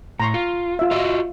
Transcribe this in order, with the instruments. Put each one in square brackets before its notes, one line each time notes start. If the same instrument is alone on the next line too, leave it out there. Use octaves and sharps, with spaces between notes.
[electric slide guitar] A2 [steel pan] A#5 C6 C#6
[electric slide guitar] F4
[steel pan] F4 E5
[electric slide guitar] F4 F#4 D#5 [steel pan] E5